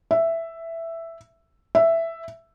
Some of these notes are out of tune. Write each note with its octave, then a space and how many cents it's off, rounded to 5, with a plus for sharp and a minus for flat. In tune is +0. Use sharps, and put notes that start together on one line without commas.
E5 +5
E5 +5